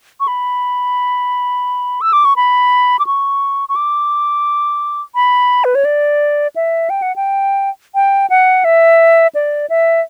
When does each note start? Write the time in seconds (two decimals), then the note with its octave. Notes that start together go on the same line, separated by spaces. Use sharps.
0.20 C#6
0.28 B5
2.01 E6
2.13 D6
2.25 C#6
2.36 B5
2.99 D6
3.07 C#6
3.69 C#6
3.76 D6
5.15 B5
5.64 B4
5.75 C#5
5.85 D5
6.56 E5
6.90 G5
7.02 F#5
7.16 G5
7.95 G5
8.30 F#5
8.65 E5
9.35 D5
9.70 E5